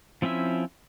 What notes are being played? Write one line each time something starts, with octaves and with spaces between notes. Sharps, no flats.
F3 C4 C#4 E4 E5